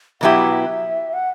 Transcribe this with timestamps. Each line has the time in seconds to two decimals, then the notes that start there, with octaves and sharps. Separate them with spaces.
0.21 B2 F#3 B3 E4 G4 F#5
0.52 E5
1.13 F#5